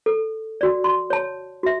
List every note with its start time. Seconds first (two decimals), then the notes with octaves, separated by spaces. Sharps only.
0.06 A4
0.61 F#4 D5
0.84 C6
1.10 C#5 A5
1.63 F#4 E5